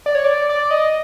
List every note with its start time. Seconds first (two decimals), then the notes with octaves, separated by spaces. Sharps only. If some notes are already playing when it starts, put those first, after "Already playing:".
0.06 D5
0.15 C#5
0.24 D5
0.49 D5
0.71 D#5